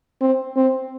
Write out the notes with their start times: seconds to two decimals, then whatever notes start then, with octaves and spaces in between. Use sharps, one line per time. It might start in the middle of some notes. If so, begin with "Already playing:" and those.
0.21 C4
0.56 C4